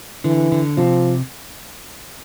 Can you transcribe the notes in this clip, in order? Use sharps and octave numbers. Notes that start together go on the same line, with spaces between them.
D3 E3
D3
C3 F3